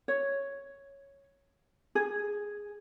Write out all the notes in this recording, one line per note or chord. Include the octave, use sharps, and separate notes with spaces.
C#5
G#4